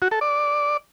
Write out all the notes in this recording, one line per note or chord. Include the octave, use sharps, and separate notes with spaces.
F#4
A4
D5